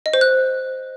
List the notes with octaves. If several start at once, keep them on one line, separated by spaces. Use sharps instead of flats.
D#5
C5
F#6